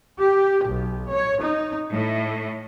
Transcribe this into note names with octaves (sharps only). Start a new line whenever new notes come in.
G4
B1
C#5
D#4
A2